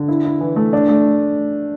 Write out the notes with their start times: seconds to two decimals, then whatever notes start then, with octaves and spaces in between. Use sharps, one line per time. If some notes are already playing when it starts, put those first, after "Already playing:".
Already playing: D3
0.08 E4
0.25 E4
0.40 E3
0.56 A3
0.73 D4
0.89 A3